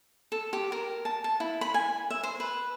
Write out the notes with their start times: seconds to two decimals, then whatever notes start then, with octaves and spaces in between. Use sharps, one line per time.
0.32 A4
0.53 G4
0.72 A#4
1.05 A5
1.24 A5
1.40 E4
1.61 B5
1.74 G#5
2.10 E5
2.23 C5
2.40 B4